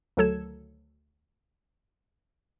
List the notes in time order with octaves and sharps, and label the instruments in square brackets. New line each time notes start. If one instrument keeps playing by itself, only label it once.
[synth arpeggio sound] D2 D#3 F#3 A4 G#6 E7